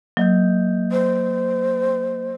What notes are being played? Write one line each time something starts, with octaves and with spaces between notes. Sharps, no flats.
F#3 A#3 D#5 G6
C5